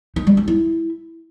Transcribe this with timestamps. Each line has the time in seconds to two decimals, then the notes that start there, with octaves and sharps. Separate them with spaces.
0.16 D#4
0.27 G3
0.37 D#4
0.48 E4